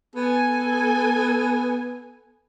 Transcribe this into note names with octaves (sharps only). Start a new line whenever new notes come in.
B3 A4 G#5